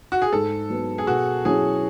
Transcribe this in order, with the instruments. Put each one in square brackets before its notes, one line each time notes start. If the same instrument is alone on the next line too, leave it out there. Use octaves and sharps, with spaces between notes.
[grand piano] F#4
G#4
[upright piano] G#2 [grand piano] A4
[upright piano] F#3 B3
[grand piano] G#4
[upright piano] B2 [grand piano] F#4
[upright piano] F#3 C#4 E4 [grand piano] G#4